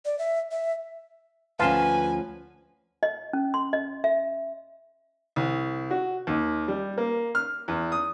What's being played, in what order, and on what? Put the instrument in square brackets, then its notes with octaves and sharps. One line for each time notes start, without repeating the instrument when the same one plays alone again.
[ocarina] D5
E5
E5
[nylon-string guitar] D2 F3 C#4 [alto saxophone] B4 [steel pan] F5 A5 C6 [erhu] G#5
[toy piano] D#5
C#4
C6
D#5
E5
[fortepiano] C2
F#4
D#2
G3
A#3
F6
E2
D#6